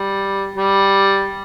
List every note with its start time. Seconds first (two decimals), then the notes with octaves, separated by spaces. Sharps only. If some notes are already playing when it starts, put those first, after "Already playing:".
Already playing: G3
0.56 G3